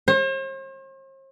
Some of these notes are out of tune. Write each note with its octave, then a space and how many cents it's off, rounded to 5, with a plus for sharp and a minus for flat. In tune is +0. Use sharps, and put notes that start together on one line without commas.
C5 +45